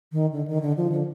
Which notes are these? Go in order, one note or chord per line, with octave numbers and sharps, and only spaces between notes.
D#3
D3
D#3
D3
F3
D3